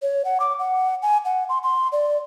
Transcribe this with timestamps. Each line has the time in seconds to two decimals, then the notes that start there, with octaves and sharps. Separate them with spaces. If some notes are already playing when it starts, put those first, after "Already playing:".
0.02 C#5
0.25 F#5
0.40 D6
0.59 F#5
1.02 G#5
1.25 F#5
1.49 C6
1.63 C6
1.92 D5